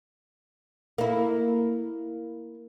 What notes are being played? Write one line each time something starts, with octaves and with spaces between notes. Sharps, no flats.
A#3 E4